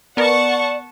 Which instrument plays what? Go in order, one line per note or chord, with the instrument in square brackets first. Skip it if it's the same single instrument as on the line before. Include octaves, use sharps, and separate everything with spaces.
[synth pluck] B3 A#4 [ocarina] D5 [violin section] F#5 A5 C#6